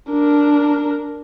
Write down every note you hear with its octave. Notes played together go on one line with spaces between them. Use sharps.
D4 A#4